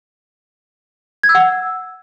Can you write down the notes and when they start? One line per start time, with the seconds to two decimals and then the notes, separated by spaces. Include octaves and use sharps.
1.23 G#6
1.29 E6
1.35 F#5
1.40 E6